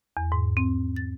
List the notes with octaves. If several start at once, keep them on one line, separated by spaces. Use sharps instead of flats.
E2
G#2
C4
A6